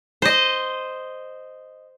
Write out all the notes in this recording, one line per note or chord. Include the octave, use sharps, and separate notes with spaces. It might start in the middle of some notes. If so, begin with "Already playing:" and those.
C5 D#5